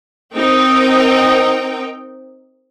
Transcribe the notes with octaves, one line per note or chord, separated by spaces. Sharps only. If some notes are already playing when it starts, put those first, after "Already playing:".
C4 D#4 A#4 G5